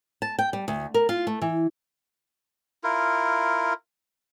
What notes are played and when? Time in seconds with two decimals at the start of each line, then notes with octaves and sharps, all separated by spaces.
0.22 A5
0.39 G5
0.53 G3
0.68 D2
0.94 A#4
1.09 F4
1.27 A3
1.42 E3
2.84 E4 F4 A#4